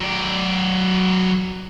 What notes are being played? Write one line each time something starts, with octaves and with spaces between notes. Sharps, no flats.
F#3 D5